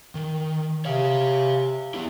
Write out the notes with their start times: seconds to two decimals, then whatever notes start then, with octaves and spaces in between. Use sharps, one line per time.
0.15 D#3
0.85 C3 C#5 F5
1.94 E3 B3 E4